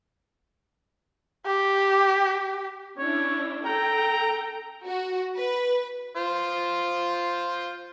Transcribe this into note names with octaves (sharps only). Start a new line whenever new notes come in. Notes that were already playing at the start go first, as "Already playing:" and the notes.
G4
C#4 D4 E4 C#5
A4 G5 A#5
F#4
B4
F4 C5